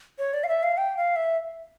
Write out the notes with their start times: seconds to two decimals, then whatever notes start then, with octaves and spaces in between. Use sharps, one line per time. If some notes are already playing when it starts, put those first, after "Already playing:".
0.19 C#5
0.33 D5
0.44 F5
0.48 E5
0.63 F5
0.77 G5
0.97 F5
1.16 E5